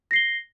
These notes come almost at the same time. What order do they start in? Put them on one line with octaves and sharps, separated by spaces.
A#6 C7 G7